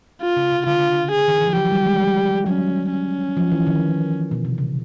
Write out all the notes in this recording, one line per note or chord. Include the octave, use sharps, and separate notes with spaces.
F4
C#3
C3
D3 F4
G#4
D#3
E3
F3
F#3 G4
G3
G#3
G3
F#3 C#4
C#4
F3
E3
D#3
B2
C3
C#3